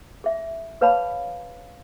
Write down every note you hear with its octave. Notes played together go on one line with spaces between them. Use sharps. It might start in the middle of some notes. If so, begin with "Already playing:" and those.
G#4 E5
G#4 B4 C#5 F5 A5 B5